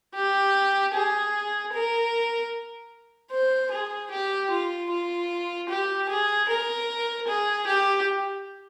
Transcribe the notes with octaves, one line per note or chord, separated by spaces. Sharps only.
G4
G#4
A#4
C5
G#4
G4
F4
F4
G4
G#4
A#4
G#4
G4